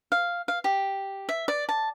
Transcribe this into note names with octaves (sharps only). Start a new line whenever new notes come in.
F5
F5
G4
E5
D5
A5